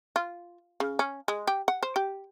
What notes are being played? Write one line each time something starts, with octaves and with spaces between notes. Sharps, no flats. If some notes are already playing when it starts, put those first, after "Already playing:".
F4
C#3
C#4
G#3
G4
F#5
C5
G4